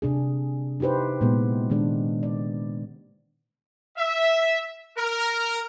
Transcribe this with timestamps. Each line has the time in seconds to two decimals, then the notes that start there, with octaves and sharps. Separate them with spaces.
0.02 C3 D4 G#4
0.80 D#4 E4 G4 B4 C5
1.21 A#2 G#3 B3
1.70 D#3 G#3 D4
2.23 D5
3.97 E5
4.97 A#4